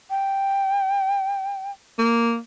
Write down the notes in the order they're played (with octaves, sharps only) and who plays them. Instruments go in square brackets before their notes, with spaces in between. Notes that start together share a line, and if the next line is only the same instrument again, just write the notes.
[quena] G5
[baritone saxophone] A#3